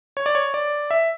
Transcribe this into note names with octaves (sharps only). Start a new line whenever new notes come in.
C#5
D5
C#5
D5
E5